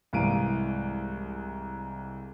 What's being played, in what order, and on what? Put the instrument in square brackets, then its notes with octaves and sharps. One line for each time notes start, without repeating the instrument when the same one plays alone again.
[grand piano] C2 G#2 E3 F5 D7 D#7